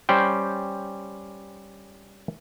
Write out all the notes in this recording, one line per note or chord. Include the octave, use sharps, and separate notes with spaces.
G3 C#4 C5 G5